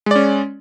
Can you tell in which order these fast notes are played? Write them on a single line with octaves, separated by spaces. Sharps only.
G#3 D5 C#4